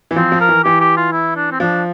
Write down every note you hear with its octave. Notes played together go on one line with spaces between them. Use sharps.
E3
F3 C4
F3
A#4
E3
E3 G4
G4
F4
E4
D4
C4
F3 D4